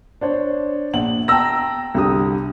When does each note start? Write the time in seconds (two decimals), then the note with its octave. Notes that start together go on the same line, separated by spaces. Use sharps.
0.21 D4 C5 C#5
0.93 A#1 F#5 F#7
1.28 G5 A5 A#5 E6 A#6
1.94 C2 D3 G4 D#6